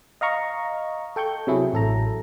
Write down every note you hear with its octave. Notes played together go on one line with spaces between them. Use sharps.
D#5 F5 A#5 C#6
A4 G5 C#6 G6
C3 F#3 E4 G#4
A1 A4 A#5